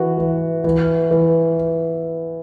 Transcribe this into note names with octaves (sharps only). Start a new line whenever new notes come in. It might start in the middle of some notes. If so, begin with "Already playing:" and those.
Already playing: E3 F#4
E3
E3
E3